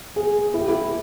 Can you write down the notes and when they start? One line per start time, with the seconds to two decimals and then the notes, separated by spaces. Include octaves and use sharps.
0.16 G#4
0.54 E4
0.61 G4
0.68 E4